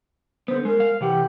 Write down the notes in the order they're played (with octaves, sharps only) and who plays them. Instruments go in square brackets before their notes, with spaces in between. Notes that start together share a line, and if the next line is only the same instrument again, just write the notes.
[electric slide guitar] D3 B3 [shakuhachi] C5
[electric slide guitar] G#3 [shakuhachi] A#4
[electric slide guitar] F5
[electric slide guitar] C3 E3 F#5 [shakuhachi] G4